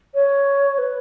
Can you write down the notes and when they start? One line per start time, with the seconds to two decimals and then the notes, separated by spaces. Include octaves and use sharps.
0.14 C#5
0.78 B4